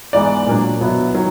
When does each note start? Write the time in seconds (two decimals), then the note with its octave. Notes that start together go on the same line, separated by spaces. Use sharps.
0.13 G#2 E3 G#3 B3 D5
0.47 A#2 F#3 A#3 D4
0.81 B2 F#3 B3 E4
1.14 D#3 F#3